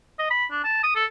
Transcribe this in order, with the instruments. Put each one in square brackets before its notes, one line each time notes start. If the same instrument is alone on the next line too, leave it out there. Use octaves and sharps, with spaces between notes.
[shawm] D#5
B5
D4
A5
D#6
A4